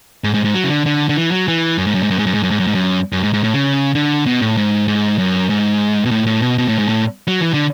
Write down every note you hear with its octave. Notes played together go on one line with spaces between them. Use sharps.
G#2
G#2
G#2
F#3
C#3
D3
D3
D3
E3
F#3
E3
F#2
G#2
F#2
G#2
F#2
G#2
F#2
G#2
F#2
G#2
F#2
G#2
F#2
F#2
G#2
G#2
A2
C#3
D3
B2
A2
G#2
G#2
F#2
G#2
B2
A2
A2
B2
B2
A2
G#2
A2
F#3
E3
D3